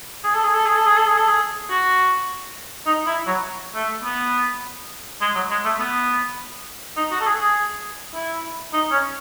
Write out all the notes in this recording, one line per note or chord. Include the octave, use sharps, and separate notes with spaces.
G#4
A4
G#4
A4
G#4
A4
G#4
A4
G#4
A4
G#4
F#4
D#4
E4
F#3
A3
B3
G#3
F#3
G#3
A3
B3
D#4
F#4
A4
G#4
G#4
E4
D#4
C#4